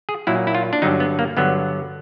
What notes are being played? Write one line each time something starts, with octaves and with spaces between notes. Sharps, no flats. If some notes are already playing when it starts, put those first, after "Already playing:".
G#4
A#2 F#3 A#3 E4
E4
F4
D4
G2 D3 F#3 D#4
B3
A#3
G2 D3 F#3 B3